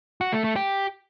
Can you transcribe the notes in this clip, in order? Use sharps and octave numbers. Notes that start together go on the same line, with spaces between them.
F#4
A3
A3
G4